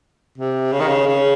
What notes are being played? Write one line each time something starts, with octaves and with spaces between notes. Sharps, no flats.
C3
C#3
D#3
C#3
C#3